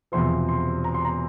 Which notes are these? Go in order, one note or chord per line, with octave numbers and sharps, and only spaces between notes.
E1 E2 C3 F3 C6
C6
A#5
C6
A#5